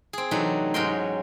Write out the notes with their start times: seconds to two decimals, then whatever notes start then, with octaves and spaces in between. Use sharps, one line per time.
0.13 C4 G#4
0.31 C3 E3 F#3 A3 D4 D#4
0.74 G#2 F#3 C#4 D#5 G5 C6